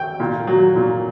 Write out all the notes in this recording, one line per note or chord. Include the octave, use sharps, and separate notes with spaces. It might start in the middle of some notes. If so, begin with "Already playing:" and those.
Already playing: G5
A#2
F#3
A#2